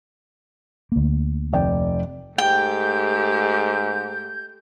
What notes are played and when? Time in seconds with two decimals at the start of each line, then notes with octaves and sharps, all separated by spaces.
0.92 D2 A#3
1.53 F1 D5 G5
2.38 G#2 A3 G4 G5 G6